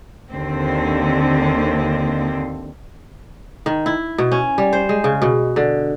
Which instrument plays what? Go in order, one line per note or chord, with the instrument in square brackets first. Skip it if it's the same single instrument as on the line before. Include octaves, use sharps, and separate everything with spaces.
[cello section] D#2 D3 C4
[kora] D#3
E4
B2
C#4
G3
C5
G#3
C#3
B2
D3